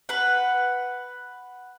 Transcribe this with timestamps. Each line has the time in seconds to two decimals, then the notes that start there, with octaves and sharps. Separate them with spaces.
0.09 B4 F#5